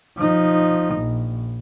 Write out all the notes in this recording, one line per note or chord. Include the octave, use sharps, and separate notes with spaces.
F3 D#4
A#1